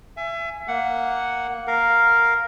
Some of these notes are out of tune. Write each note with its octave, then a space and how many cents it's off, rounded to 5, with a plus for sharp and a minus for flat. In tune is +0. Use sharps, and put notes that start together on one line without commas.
E5 +30 G#5 +0
A#3 -5 F#5 +0
A#4 +0 F5 +0